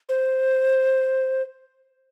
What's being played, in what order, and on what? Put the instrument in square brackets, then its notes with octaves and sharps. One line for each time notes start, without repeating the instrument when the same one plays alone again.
[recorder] C5